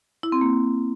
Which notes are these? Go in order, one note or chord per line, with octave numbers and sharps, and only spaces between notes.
E4
C4
A#3